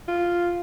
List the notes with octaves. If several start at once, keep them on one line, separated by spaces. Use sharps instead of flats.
F4